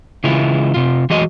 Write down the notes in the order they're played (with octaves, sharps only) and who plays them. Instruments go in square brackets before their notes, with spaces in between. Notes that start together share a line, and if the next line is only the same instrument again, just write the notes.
[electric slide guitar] C#3 E3 G#3 E4 F4
C3 F4
E3 F#3 G#3 A3 F#4 D#5